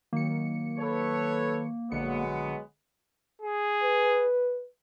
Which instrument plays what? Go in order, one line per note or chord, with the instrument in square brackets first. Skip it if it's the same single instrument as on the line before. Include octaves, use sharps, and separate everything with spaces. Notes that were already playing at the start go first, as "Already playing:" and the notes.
[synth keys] D#3 F#3 C#7 [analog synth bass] A#3
[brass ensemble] A4 B4 C#5
[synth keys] A#1 D3 C#7 [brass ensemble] F#3 G#3 B3
[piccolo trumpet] G#4
[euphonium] B4